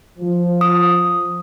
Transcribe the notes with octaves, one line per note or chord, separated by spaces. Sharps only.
F3
D#6